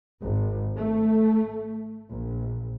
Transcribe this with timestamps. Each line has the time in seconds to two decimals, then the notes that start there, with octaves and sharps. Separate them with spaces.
0.23 G#1
0.77 A3
2.09 A#1